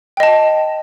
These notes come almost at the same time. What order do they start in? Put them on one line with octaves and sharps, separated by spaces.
G5 D#5 A5